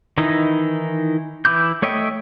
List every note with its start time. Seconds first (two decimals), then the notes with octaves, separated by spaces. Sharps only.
0.18 D#3 E3 D#4 E4 D#5
1.45 E3 E4 D6 G6
1.82 A3 C#5 D#5 E5 G5